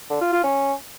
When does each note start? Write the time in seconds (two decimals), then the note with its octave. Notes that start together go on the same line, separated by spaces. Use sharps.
0.10 D3
0.21 F4
0.32 F4
0.44 C#4